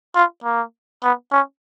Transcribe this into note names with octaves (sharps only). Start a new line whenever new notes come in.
F4
A#3
B3
C#4